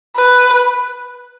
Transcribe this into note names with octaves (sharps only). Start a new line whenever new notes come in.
B4